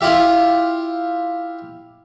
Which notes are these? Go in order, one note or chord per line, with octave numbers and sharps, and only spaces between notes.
E4 F4 G4 E5